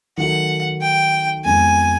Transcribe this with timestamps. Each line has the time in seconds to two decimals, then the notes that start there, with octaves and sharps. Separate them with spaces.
0.17 D#3 F#3 A3 F#5
0.81 G5
1.45 F2 C#3 F3 G#3 B3 G#5